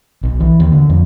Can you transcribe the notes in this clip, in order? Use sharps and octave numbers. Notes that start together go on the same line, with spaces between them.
B1
E3
D#2
D3
F2